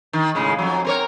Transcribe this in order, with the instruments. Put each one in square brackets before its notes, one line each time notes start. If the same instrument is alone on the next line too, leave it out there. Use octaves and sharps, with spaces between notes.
[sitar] D#3
A2 C#3 G#3
F2 F#3
C4 A#4 C#5